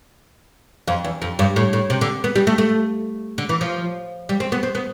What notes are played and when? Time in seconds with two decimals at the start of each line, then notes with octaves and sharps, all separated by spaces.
0.88 F2
1.04 E2
1.22 F2
1.39 G2
1.56 A2
1.73 A2
1.90 C3
2.01 D3
2.24 B3
2.36 G3
2.47 A3
2.58 A3
3.38 D3
3.49 E3
3.61 F3
4.29 G3
4.40 C4
4.52 B3
4.63 C4
4.75 B3